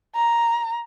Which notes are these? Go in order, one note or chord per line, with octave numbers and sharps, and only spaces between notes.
A#5